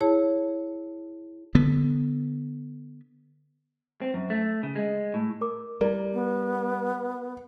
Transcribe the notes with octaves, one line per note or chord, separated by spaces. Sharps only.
E4 G#4 C#5 A5
D3 B3
C4
F#2
A3
C#3
G#3
A2
A#4 D6
G3 E4 A#4 D5
B3